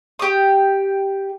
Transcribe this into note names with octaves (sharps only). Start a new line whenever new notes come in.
G4 D#6